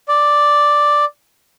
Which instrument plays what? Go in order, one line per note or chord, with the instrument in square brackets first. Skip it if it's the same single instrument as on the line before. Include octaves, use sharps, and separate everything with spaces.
[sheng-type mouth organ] D5